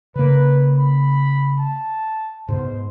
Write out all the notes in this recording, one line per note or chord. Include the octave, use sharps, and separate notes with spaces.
C#3 A#3 B4
B5
A5
G#2 B2 C5